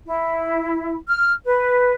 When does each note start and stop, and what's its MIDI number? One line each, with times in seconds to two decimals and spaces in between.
0.07 0.97 64
1.09 1.33 89
1.45 1.94 71